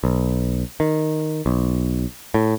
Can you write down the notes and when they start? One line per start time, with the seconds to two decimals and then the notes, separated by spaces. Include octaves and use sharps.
0.04 B1
0.80 D#3
1.46 B1
2.34 A2